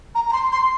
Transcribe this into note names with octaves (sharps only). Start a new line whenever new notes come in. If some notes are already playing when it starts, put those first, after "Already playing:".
A#5
A#5
C6
C6